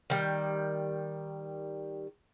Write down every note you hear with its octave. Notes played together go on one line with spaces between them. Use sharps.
D#3 G3